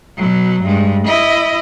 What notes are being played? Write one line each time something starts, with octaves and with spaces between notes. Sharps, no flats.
B2 F#3
G2 G#3
E4 D#5